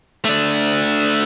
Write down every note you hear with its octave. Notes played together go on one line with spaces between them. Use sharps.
A3 D4